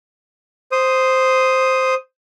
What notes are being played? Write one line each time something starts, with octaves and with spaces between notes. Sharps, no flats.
C5 D#6